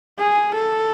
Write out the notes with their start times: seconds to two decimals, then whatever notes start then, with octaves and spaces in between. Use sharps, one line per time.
0.19 G#4
0.54 A4